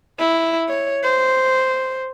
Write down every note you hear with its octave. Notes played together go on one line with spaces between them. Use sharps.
E4
C#5
C5